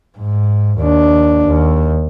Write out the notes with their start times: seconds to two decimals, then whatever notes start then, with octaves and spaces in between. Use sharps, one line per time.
0.18 G#2
0.79 D#2 D4
1.47 D#2